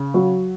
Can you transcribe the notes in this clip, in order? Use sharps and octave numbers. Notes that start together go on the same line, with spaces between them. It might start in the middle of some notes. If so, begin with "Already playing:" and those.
Already playing: C#3
F#3